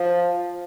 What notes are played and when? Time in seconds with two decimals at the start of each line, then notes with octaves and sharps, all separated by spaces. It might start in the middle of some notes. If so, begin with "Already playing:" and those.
Already playing: F3